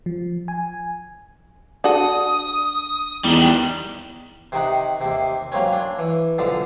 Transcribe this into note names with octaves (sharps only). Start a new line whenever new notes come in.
F3
G#5
D4 F#4 A4 D#6
E2 D#3 G3 F#7
C3 D#3 D#4 F#5
D#2 C3
F#3 A#3 C4 C#4
D4
E3
B1 D3 F3 A5